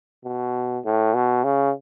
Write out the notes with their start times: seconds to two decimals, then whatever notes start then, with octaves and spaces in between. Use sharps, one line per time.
0.25 B2
0.85 A2
1.14 B2
1.44 C#3